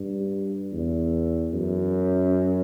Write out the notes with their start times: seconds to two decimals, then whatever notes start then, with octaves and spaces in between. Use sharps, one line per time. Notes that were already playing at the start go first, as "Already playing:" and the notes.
Already playing: G2
0.72 E2
1.54 F#2